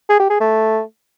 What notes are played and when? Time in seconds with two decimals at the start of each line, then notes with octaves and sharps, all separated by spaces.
0.09 G#4
0.20 G4
0.30 G#4
0.40 A3